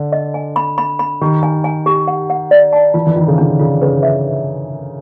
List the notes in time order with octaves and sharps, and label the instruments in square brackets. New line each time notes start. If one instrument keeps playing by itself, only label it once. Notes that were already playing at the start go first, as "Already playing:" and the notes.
Already playing: [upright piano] D3
[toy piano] D#5
G#5
B5
B5
B5
[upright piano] D#3 [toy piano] G4
[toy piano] G#5
G#5
G4
F#5
F#5
D5
A5
[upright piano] E3 [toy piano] F4
[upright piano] E3
[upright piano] D#3 [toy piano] F4
[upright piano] C#3
[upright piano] D3 [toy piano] D4
[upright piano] C#3 [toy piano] F4
[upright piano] C#3 [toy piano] B4
[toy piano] E5